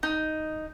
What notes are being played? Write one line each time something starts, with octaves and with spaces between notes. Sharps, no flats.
D#4